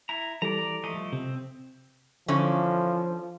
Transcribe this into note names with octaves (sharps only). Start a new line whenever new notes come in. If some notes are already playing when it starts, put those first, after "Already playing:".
E4 A#5
E3 G3 A4 D5 A#5
F3 A3 D#5
C3 C4
D3 E3 F3 C#4